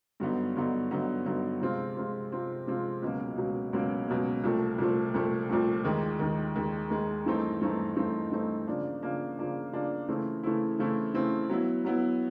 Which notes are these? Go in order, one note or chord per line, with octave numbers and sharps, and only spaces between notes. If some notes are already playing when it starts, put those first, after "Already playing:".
G2 D3 F#3 B3 D#4
G2 D3 F#3 B3 D#4
G2 D3 F#3 B3 D#4
G2 D3 F#3 B3 D#4
C3 F3 G#3 C4 F4
C3 F3 G#3 C4 F4
C3 F3 G#3 C4 F4
C3 F3 G#3 C4 F4
C#2 B2 F#3 A#3
C#2 B2 F#3 A#3
C#2 B2 F#3 A#3
C#2 B2 F#3 A#3
C2 A#2 F3 A3
C2 A#2 F3 A3
C2 A#2 F3 A3
C2 A#2 F3 A3
D#2 D#3 G#3
D#2 D#3 G#3
D#2 D#3 G#3
D#2 D#3 G#3
G2 E3 A3 C4 D#4
G2 E3 A3 C4 D#4
G2 E3 A3 C4 D#4
G2 E3 A3 C4 D#4
C#3 F3 A#3 D4
C#3 F3 A#3 D4
C#3 F3 A#3 D4
C#3 F3 A#3 D4
C#3 E3 A3 C4 E4
C#3 E3 A3 C4 E4
C#3 E3 A3 C4 E4
C#3 E3 A3 C4 E4
F#3 B3 E4
F#3 B3 E4